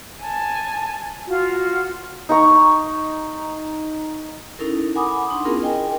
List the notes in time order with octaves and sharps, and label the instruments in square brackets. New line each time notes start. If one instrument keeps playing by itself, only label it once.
[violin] G#5 A5
[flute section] F4 F#4
[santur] D#4 A#5 C#6
[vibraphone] C#4 D#4 E4 A4 A#4
F#5 G#5 B5 D6 D#6
D4 D#4 C6
B3 C#4 E4 F4 G#4 A#4
A#4 D#5 G5 G#5